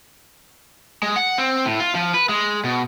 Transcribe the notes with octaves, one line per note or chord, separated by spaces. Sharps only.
G#3
F#5
C4
A2
F4
F3
B4
G#3
B2